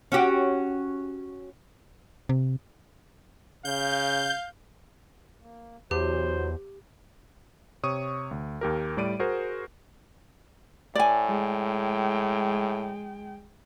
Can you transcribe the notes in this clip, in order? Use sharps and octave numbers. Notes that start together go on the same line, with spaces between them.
C#4 F#4 G4
C3
C#3 F5 G6
A#3
E2 B2 F#3 G4 C5
C3 C#5 C#6 D#6 D#7
D2
D#2 G4 A#4
A2 G3 D5 D7 D#7
F#4 G#4 A#4 C5
A2 D5 G#5
G#3 G5